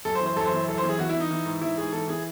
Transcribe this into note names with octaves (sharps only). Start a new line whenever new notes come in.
F#2 A4
C5
E3
C5
F#2 A4
C5
E3
F#2 A4
C5
E3
G#4
E3 F#4
E4
E3
D#4
E3
G#2
E3 E4
G#2 G#4
E3 A4
E3 G#4